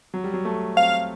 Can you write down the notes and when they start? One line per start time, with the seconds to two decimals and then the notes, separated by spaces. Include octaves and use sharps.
0.14 F#3
0.24 G3
0.34 F#3
0.45 A3
0.76 C4 F5